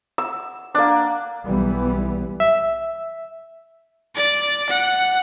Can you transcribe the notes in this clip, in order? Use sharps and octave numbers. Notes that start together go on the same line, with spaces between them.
E6
A#3 D4
B1 E3 G3 B3
E5
D5
F#5